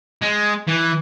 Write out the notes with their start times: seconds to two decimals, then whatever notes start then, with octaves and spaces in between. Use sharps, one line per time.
0.22 G#3
0.67 E3